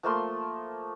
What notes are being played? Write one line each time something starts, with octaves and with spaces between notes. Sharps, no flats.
F3 A3 A#3 C6